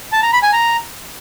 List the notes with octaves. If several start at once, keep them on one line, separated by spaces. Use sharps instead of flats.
A5
A#5
B5
G#5
A#5